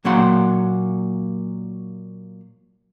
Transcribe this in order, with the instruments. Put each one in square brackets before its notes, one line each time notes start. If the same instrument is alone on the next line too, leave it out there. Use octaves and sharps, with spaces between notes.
[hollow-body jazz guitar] A#2 F#3 A#3 D4 F#5 C6